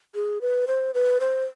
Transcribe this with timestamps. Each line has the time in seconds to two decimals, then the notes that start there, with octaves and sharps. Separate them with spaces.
0.15 G#4
0.41 B4
0.67 C5
0.94 B4
1.20 C5